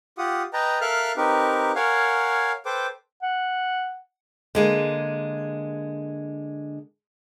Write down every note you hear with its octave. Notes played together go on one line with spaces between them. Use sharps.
F4 G4 F#5 D#6
B4 D#5 G5 A5 A#5
A4 A#4 E5 F5 F6 F#6
C4 D#4 G4 A#4 B4
A#4 C#5 F5 F#5 G#5
A4 B4 C5 G5 D6
F#5
D3 G#3 A#3